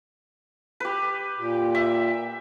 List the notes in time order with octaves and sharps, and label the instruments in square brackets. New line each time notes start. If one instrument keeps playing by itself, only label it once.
[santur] G4 B4
[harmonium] A#2 G4
[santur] E5